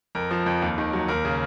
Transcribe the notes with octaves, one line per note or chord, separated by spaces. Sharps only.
F2 A#4
F3
F2
D#2
D#3
F#3
D#2 A#4
C#3